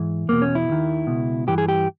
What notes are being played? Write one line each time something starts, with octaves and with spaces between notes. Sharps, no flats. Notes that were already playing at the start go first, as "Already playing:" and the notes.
Already playing: G#2 E3
E2 B2 A#3
C#4
E4
D#2 D#3
C#2 B2
G2 E3 G4
G#4
G4